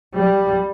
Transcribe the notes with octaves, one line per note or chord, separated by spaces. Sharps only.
G3